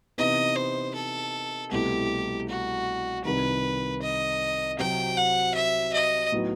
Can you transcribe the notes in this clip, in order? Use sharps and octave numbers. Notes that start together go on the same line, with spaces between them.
C3 E3 B3 D#4 D#5
C5
A4
C2 B2 A3 E4 G4
F#4
C2 C3 D#3 B4
D#5
C3 F#3 C4 F#4 C5 G5
F#5
E5
D#5
A2 F#3 B3 D#4 F#4